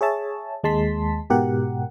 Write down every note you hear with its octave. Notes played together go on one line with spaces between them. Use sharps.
G#4 C#5 E5 A5
D#2 G#3 A5 C6 B6
G#2 B2 G4 A#4 F#5